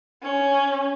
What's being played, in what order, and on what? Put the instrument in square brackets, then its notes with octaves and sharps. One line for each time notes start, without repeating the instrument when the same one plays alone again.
[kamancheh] C#4